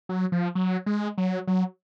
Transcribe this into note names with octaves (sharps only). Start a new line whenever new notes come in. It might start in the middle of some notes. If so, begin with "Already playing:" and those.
F#3
F3
F#3
G#3
F#3
F#3